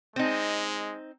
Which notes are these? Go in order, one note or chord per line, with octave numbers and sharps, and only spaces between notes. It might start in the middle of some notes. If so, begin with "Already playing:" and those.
G#3 C4 D#4